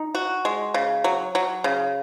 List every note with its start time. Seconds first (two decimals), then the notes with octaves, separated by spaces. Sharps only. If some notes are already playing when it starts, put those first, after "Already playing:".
Already playing: D#4
0.15 F#4
0.45 G#3
0.74 C#3
1.04 F#3
1.35 F#3
1.64 C#3